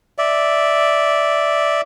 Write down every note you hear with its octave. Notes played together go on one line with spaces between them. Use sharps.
D5 E5